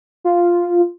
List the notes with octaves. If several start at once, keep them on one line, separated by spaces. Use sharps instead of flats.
F4